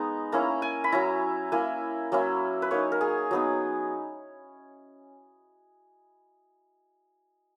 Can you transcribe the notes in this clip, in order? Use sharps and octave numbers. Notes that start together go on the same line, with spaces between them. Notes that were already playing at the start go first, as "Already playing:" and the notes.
Already playing: G#3 B3 D#4 A#5
A#3 C#4 E4 A#5
G#5
B5
F#3 C#4 E4 A#5
A#3 E4 G#5
F#3 A#3 C#4 E4
B4
A#3 D#4 C#5
A#4
G#4
F#3 B3 D#4